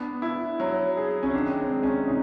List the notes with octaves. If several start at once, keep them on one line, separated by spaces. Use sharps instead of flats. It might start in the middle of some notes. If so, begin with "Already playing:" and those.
Already playing: B3 D4
E4
F#3
G#4
C#4
D#3 D4
C4
G#3
C#4
C3 D#4